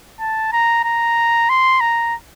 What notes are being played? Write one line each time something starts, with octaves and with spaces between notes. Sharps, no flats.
A5
A#5
A#5
C6
A#5